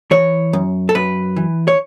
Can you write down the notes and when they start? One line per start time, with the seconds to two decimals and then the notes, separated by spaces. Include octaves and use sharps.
0.11 E3 C#5
0.53 F#2
0.89 A4
0.95 F#2 B4
1.36 E3
1.68 C#5